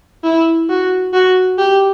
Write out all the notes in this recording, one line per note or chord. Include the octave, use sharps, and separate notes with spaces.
E4
F#4
F#4
G4